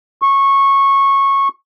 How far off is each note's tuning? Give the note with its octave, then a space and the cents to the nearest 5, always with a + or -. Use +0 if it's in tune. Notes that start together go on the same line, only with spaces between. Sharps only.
C#6 -15